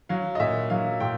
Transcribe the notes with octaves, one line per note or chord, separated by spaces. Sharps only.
F#3 F5
D#5
A#2 E5
F#3 F5
A#2 G5